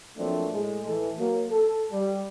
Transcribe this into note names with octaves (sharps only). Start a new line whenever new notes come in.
F3 F#3 A3 A#3 C4 D4
A2 G#3
A2 E3 A4
F#3 A#3
A4
G3